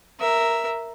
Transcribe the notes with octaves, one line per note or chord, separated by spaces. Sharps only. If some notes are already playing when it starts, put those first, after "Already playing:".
A#4 E5